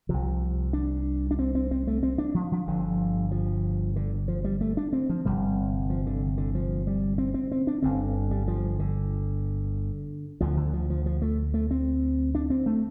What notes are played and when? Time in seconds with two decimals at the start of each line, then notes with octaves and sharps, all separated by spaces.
0.09 C2 C3 F3
0.73 D4
1.31 D4
1.39 C4
1.55 C4
1.71 C4
1.87 A3
2.03 C4
2.18 D4
2.34 F3
2.52 F3
2.67 G1 G2 D3
3.31 F3
3.96 D3
4.28 F3
4.44 G3
4.61 A3
4.77 D4
4.93 C4
5.10 F3
5.25 G1 F2 C3 G3
5.90 F3
6.06 D3
6.37 D3
6.55 F3
6.87 G3
7.18 C4
7.34 C4
7.52 C4
7.67 D4
7.82 G1 G2 D3 C4
8.31 G3
8.48 F3
8.79 D3
10.41 D2 D3 F3
10.57 D3
10.73 F3
10.90 F3
11.06 F3
11.22 A3
11.54 A3
11.71 C4
12.35 D4
12.50 C4
12.66 A3